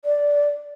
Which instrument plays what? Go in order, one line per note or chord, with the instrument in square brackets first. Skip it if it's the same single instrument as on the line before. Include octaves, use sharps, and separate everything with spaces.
[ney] D5